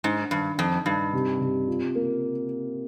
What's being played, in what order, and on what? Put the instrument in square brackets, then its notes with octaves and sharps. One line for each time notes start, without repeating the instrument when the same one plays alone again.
[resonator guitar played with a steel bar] G#2 [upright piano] D4
[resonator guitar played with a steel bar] G2 [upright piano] D#3
[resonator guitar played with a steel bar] F2 [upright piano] D#4
[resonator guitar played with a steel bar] G2 [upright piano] D#4
[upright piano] C3
C3
F4
A#3